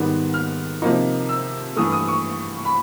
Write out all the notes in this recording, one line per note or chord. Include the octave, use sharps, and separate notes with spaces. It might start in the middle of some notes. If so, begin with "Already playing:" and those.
Already playing: G#2 D#3 G3 B3
F6
C3 F3 A#3 D#4
E6
G2 E3 A3 D#6
D#6
C#6
B5